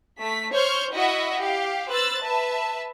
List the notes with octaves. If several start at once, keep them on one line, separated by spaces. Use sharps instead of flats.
A3 B6
C5 C#5 C#6 F6 G6
E4 F#4 D#5 E5 F#5
G4 F5
B4 C5 E6 F#6 A6
B4 E5 A5